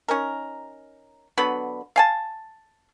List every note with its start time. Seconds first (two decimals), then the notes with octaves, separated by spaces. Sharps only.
0.08 C#4 D#4 A#4
1.37 D3 F#3 B3 B5
1.96 F5 G#5 A5